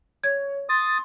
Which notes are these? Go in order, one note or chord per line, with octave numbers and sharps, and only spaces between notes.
C#5 G#6
C6 D#6 A6